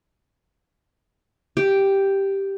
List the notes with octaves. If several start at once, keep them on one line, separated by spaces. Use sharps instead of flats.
G4